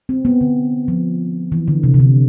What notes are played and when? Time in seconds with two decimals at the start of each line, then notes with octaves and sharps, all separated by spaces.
0.09 C4
0.25 B3
0.41 D3
0.88 F3
1.52 E3
1.68 D3
1.83 C3
1.94 C3
2.00 D3